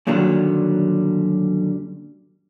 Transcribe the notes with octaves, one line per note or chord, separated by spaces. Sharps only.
F#2 A#2 D3 D#3 F#3 G3